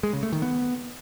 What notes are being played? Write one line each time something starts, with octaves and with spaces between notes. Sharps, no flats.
G#3
C#3
A3
D#3
B3